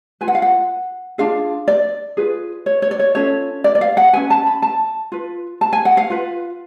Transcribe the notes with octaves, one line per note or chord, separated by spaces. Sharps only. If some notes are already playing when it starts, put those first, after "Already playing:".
F4 B4 G#5
F#5
F5
F#5
D4 F4 G#4 F5
D5
F4 G#4 B4
C#5
C#5
D5
C#5
C#4 F4 A4 C#5
D5
D5
F5
F#5
C#4 G#4 B4 G#5
A5
B5
A5
F4 B4
A5
G#5
F#5
F5
F4 B4